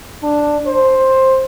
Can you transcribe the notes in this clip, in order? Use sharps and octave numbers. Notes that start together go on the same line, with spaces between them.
D4
C5